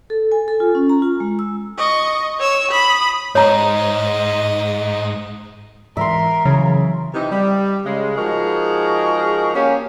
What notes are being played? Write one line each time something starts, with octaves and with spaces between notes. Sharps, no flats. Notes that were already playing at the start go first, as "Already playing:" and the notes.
A4
G#5
A4
F4
C#4
A#5
F4
G#3
E6
D#5 C#6
C#5 E6
B5 D#6
G#2 C#5 D#5 A#5
G#2 E3 A#4 E5 C6
C#3 E3 F#3
C3 E3 D#4
G3
C#3 G#3
F3 G#3 D#4 F#4 G#4 A#4
A#3 C#4 G4